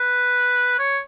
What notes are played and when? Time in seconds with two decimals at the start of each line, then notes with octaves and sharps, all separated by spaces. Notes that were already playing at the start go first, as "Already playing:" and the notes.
Already playing: B4
0.79 C#5